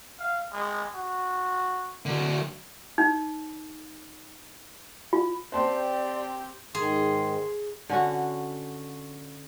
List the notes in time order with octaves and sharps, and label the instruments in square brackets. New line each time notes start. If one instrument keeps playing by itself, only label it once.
[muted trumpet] F5
G#3
F#4
[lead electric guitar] D3 F#3
[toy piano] D#4
F4
[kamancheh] C4 G4 [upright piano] C5 A5 C6 [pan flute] D5
[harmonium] G#2 D#3 [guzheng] G#4 [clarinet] C6
[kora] D3 C#4 F#4